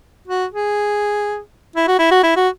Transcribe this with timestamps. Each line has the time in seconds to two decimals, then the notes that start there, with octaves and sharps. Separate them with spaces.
0.28 F#4
0.53 G#4
1.76 E4
1.88 F#4
1.99 E4
2.11 F#4
2.24 E4
2.36 F#4